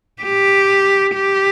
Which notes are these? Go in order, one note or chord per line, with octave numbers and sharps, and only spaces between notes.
G4
G4